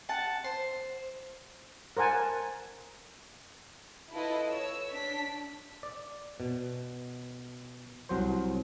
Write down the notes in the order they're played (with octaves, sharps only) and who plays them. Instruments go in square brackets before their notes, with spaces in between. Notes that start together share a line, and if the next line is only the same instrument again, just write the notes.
[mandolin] F#5 A5
C5
[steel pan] A#4 C5 F#5 G#5 A5
[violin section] E4 F4 A4 B4 D#5
C#5 E6
D4 B6
[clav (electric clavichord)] D5
B2
C2 F#3 C5